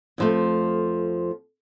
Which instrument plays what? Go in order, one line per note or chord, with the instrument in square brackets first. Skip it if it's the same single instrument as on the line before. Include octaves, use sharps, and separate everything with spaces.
[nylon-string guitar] F2 F3 A3